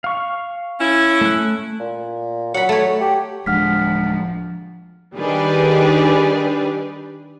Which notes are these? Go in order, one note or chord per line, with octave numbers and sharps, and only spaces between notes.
F5 C#6
C#4 E4
A3 F#6
A#2
F#3 F#5 B5
A3 C#5
G4
D1 F3 G#3 D4 F#5 F6 B6
D#3 G3 D4 G4 G#4 B4